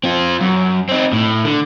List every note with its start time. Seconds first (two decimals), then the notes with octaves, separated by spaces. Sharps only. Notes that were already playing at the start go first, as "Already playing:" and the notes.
0.04 C4 F4
0.41 F#2
0.89 C4 D#4
1.12 A2
1.44 D3